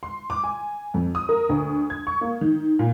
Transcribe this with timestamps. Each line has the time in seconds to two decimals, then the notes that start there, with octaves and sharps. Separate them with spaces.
0.03 C6
0.30 D6
0.44 G#5
0.94 F2
1.15 D#6
1.29 A#4
1.49 D2
1.90 G#6
2.07 C#6
2.21 A#3
2.41 D#3
2.79 A#2